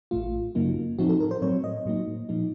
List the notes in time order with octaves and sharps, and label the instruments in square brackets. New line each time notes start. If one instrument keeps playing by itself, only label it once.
[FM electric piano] A1 A2 A3 F4
F#2 C#3 F#3 A#3 D#4
A2 F3 C4 D#4 F#4
A4
A#4
C5
A2 F#3 C4 C#5
D#5
A2 F#3 A#3 D#4
A#2 F3 A#3 D#4